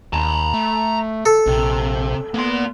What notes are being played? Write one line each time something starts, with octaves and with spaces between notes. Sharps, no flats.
D#2 A5 A#5
A3
A4
A#1 C3
A#3 B3 C6